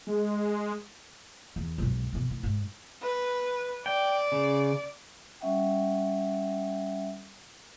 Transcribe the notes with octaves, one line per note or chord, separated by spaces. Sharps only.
G#3
E2
B1 G#2
E2 B2
A2
G#2 G#3
B4
D5 G5
C#3
G3 C#4 E5 F#5 G5